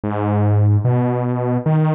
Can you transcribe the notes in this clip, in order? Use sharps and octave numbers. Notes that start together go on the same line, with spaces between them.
G#2
B2
D#3